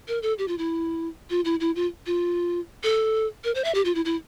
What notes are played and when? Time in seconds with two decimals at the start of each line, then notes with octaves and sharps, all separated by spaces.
0.08 A#4
0.22 A4
0.38 G4
0.48 F4
0.58 E4
1.30 F4
1.45 E4
1.60 E4
1.76 F4
2.06 F4
2.84 A4
3.44 A#4
3.55 C5
3.64 E5
3.75 G4
3.85 F4
3.95 E4
4.05 E4